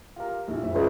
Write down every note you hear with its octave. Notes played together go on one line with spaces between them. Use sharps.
F4 G4 A#4
A#1 E4 G4
F#1 C5 E5
C#2